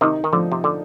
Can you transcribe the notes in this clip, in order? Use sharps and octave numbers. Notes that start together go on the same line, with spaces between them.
C3 D#3 D#4
D#3
D3 F3
C3
D3